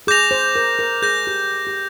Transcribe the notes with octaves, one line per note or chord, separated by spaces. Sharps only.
G#4 D6 G6 A#6 F7
C5
A#4
A#4
G#4 G6 A#6 F7
G4
G4